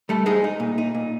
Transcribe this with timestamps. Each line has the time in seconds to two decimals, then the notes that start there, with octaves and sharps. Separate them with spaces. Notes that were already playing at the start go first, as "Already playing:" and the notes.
0.09 G3 A3 A4
0.26 G#3 D#4 G#4
0.44 D#4
0.60 A#2
0.78 D#4
0.95 A#2